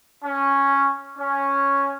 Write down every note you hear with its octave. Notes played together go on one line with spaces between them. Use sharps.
C#4
C#4